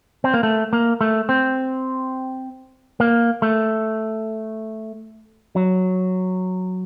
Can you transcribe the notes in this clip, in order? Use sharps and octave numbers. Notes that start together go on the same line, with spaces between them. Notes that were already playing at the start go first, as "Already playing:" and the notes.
C4
A#3
A3
A#3
A3
C4
A#3
A3
F#3